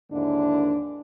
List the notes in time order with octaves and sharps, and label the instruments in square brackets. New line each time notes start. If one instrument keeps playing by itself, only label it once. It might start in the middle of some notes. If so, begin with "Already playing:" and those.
[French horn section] D#2 G#2 D3 A#3 D4 E4